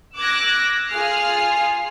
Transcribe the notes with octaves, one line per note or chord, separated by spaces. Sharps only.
D6 E6 F#6 G#6 A#6
F4 G#4 G#5 F6 C7